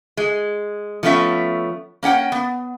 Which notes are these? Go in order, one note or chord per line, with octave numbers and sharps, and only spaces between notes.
G#3
F3 A3 B3 C#4 E5
A#3 C#4 F#5 G5
B3